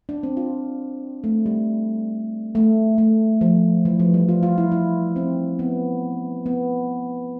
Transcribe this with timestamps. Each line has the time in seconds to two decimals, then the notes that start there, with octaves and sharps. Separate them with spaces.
0.09 D4
0.23 C4
0.37 F4
1.24 A3
1.46 G3
2.55 A3
2.98 A3
3.41 F3
3.85 E3
4.00 F3
4.14 G3
4.29 F4
4.43 F4
4.58 E4
4.72 E4
5.16 C4
5.59 B3
6.46 B3